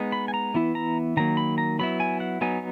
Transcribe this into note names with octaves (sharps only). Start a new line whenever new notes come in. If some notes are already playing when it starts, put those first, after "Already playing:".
Already playing: G#3 B3 D#4
B5
G#5
A#5
E3 B3 E4
A#5
D#3 F#3 A#3 A#5
B5
A#5
F#3 B3 E4 B5
G#5
F#5
F#3 B3 D#4 G#5